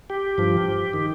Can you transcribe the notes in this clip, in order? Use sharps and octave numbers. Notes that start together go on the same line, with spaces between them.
G4
G2 F3
D#3